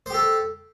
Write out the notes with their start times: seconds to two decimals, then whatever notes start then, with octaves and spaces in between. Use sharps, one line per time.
0.06 C5
0.10 G4
0.14 A4